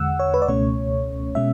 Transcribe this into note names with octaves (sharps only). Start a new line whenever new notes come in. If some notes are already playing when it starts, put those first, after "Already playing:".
Already playing: E2 D3 G#3 F#5 E6
C#5
B4
D5
C#2 B2 A3 C#4 C#5
B2 G#3 C#4 E5